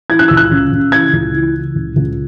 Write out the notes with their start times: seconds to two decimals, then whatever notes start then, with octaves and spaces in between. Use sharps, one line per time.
0.10 E3 G#6
0.19 F#6
0.28 C#2 E6
0.37 F#6
0.51 C#3
0.72 C#3
0.92 E3 G#6
1.13 C#2
1.34 E3
1.55 E3
1.75 C#2
1.96 C#2